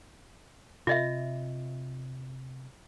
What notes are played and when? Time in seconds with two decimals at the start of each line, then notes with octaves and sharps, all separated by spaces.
0.87 C3 C4 F4 D#5 E5